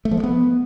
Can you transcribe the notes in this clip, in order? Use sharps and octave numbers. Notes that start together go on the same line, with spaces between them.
A3
F3
G#3
B3